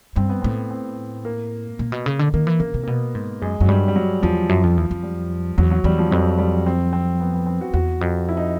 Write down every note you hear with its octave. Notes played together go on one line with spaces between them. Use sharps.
G2 C4
B3
A2 C4
C4
A#3
A#2
B2
C#3
D3
D#3 A#3
E3
C#3 A#3
C3
A#3
B2 B3
G#2
F#2 G#3
F#2 F#3
G2 G3
G3
F#3
E2 F3
F#2
F2
E2
F2
G3
E2 F#3
F#3
E2 G3
F3
F2 F#3
G3
C4
C4
B3
B3
C4
F#4
E2 F#4
F2
E4
D#4